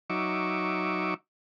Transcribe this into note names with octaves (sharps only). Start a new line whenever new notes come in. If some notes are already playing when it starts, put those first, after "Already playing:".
F#3 D#4 E5 C#6 D6